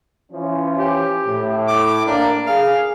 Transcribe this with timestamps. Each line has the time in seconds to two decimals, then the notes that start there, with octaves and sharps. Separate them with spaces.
0.31 E3 F3 C#4
0.78 G4
1.26 A2
1.68 D6
2.06 A#3 D4 A#4
2.47 G#4 F5